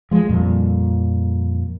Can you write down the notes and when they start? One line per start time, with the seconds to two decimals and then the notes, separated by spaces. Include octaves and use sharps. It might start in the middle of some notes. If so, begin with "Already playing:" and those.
0.11 F3 G#3
0.29 F2 A#2 F3 G3